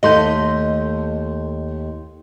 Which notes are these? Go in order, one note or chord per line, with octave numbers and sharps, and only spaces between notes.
D#2 A3 D#5 C6 G6